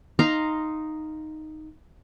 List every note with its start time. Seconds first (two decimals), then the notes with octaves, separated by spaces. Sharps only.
0.19 D#4 F5 A#5 C6